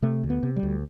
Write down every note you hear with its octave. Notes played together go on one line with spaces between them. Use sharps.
C3 A3
D2
B3
C3
G3
D2